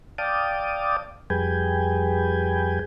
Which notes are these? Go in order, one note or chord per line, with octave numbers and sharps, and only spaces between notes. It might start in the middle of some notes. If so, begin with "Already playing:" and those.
D5 F5 G5 A5 D6 D#6
F2 G3 G#4 B4 G5 G#5